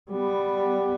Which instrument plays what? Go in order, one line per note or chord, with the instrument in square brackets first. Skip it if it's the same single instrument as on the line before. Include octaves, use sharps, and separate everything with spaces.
[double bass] G3 B3